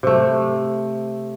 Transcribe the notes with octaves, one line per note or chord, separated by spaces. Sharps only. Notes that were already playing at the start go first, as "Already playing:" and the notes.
C3 A3